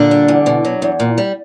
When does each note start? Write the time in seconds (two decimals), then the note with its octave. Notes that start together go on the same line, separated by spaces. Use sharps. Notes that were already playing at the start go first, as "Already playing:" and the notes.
Already playing: A#2 D3 D4
0.11 G3
0.28 E2
0.46 B2
0.65 F#3
0.82 E2
1.00 A#2
1.18 G3